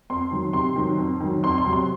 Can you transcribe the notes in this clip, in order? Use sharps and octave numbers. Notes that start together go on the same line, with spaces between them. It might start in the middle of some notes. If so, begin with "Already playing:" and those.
F2 C6
D#3 F#3
C3 C6
D#3 F#3
F2
D#3 F#3
F2 C6
C6
C3 F#3
C6